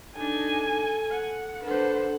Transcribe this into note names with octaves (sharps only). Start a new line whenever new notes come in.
D4 D#4 A4 G#5
F#5
D3 A4 B4 C5 F#5